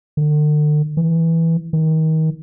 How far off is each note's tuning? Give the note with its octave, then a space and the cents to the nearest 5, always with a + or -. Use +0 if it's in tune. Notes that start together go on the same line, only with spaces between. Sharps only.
D3 +40
E3 -5
D#3 +30